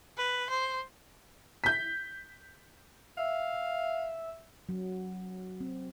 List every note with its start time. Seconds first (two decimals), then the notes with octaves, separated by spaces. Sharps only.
0.17 B4
0.50 C5
1.64 G6 B6
3.17 E5 F5
4.69 F#3
5.61 C4